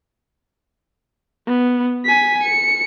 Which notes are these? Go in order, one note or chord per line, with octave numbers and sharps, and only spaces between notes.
B3
G#5 B6
C#7